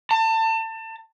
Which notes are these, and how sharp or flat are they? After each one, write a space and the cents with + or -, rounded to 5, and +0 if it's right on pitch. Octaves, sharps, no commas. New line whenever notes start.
A5 +30